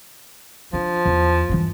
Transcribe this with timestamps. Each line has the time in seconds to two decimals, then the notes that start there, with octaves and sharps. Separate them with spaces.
0.73 F3 D4
1.05 E2
1.49 G2 E3